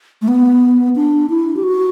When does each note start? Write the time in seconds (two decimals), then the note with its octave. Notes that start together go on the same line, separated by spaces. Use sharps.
0.22 A3
0.28 B3
0.96 D4
1.30 E4
1.56 G4
1.63 F#4